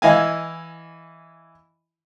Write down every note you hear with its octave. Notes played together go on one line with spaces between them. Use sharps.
E3 E4 D#5 F5 G#5